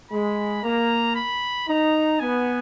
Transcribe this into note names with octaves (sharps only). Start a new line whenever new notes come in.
G#3 B5
A#3 A#5
B5
D#4 A#5
B3 G#5